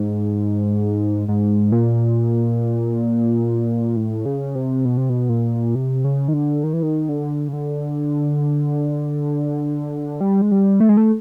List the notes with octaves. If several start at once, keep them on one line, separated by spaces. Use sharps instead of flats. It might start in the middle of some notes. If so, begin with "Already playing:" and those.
Already playing: G#2
G#2
A#2
A2
C#3
C3
B2
C3
B2
A#2
C3
C#3
D#3
D3
D#3
E3
D#3
D3
C#3
D3
G3
G#3
G3
A3
G#3
A3